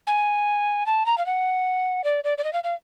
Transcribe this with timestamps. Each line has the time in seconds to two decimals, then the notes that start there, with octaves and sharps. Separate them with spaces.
0.07 G#5
0.86 A5
1.06 A#5
1.18 F5
1.26 F#5
2.04 D5
2.24 D5
2.38 D5
2.44 D#5
2.53 F5
2.64 F5